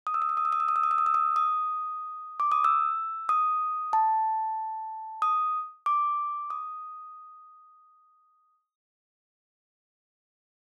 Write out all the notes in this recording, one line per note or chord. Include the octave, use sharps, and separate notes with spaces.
D#6
E6
D#6
E6
D#6
E6
D#6
E6
D#6
E6
D#6
E6
D#6
E6
D#6
D#6
D6
D#6
E6
D#6
A5
D#6
D6
D#6